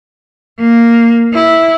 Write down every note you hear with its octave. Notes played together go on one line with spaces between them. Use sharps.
A#3
E4